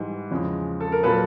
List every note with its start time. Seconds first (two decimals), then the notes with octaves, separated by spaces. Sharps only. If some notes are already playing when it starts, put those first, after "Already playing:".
Already playing: G#2 E3 G3
0.31 E2 C#3 F3 G#3
0.80 A4
0.92 A#4
1.03 A#2 F#3 A4 B4